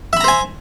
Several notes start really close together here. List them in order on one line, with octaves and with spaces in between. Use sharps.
E5 B5 A#5 C5 G#5